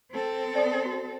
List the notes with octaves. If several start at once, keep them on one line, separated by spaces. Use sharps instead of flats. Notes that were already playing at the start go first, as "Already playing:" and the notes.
C4 A4
D5 D#6
F#4